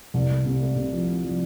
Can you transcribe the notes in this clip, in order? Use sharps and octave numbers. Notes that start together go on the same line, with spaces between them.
C2
A3
C3
A3
C3
F3
A3
F3